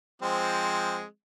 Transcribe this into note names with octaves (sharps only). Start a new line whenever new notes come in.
F3 G#3 C4